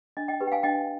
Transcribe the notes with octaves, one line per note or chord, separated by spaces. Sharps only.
D4 D#5
D#5 G5
G4 B4
G5
F5 G#5
D4 D#5 G5